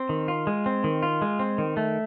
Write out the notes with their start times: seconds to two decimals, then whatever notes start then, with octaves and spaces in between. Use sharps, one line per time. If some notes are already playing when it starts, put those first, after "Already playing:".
Already playing: C4
0.09 D#3
0.28 F4
0.47 G#3
0.66 C4
0.84 D#3
1.03 F4
1.22 G#3
1.39 C4
1.58 D#3
1.77 A3